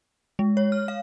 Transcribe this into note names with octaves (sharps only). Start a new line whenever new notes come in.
G#3
C#5
F6
F5